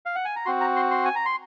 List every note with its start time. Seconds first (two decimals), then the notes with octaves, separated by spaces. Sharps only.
0.06 F5
0.15 F#5
0.25 G#5
0.36 A#5
0.46 C4 F#4 C6
0.61 A#5
0.76 C6
0.91 C6
1.05 G#5
1.16 A#5
1.26 C6